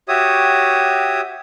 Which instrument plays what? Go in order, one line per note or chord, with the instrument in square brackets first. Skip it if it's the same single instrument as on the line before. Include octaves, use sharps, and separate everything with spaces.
[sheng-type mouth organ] F#4 G4 C#5 E5 D#6